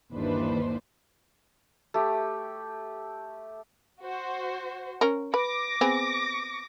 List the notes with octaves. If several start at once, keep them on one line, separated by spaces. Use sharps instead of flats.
G1 D#2 E3 D4 B4 C5
A3 G4
F#4 C5
C#4 A#4
B4 D6 A#6
B3 C4 G#4